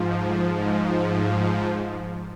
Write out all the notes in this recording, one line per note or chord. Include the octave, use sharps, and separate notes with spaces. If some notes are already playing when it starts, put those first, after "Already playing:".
Already playing: G#2 F3
A3
G#2 F3 G#3
A3